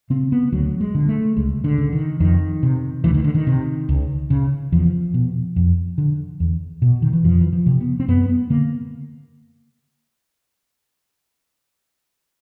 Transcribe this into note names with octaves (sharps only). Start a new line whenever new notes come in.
C#3 C4
B3
D2 F#3
G#3
D3
A3
C#2 G#3
D3
C#3
D#3
F2 D#3
C3
D2 E3
D#3
D3
D#3
C3
C#2
C#3
E2 F3
B2
F2
D3
E2
B2
D#3
E3
F2 F3
E3
F3
C3
B3
C4
F#2 B3
B3
D3 A#3